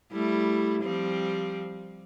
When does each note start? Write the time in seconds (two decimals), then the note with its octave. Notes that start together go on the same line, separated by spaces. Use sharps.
0.12 G3 A3 E4
0.82 F3 G3 C4